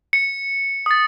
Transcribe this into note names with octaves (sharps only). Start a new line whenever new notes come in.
C#7
D#6 A6